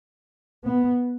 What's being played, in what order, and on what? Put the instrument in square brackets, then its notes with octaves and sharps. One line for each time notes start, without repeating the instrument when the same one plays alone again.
[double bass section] B3